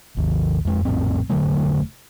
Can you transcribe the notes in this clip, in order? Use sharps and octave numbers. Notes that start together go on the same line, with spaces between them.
G#1 D#2
F2 G#3
A#1 F2 A2 C4
F1 D3 F#3 A3